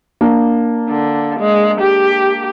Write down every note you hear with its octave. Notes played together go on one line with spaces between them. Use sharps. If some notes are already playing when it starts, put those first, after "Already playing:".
A#3 D4
D3
G#3
G4